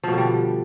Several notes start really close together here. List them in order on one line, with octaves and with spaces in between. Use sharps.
F3 B2 D3 G3